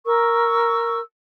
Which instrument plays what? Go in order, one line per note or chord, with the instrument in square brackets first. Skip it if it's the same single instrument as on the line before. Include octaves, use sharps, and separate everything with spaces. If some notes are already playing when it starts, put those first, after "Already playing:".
[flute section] A#4 C#6 E6